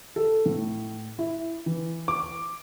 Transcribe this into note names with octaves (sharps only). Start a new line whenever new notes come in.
A4
A2
E4
E3
D6